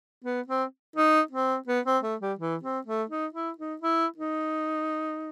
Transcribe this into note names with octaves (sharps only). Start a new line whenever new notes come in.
B3
C4
D#4
C4
B3
C4
A3
G3
E3
C4
A3
D#4
E4
D#4
E4
D#4